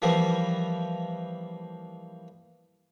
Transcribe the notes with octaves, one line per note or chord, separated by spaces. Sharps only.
E3 F3 G3 A#3